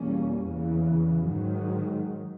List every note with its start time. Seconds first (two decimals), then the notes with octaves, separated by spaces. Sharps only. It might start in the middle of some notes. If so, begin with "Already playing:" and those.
Already playing: E2 B2 G3 A#3 C#4
0.44 E2 C#3 E3
1.27 G#2 D#3 F#3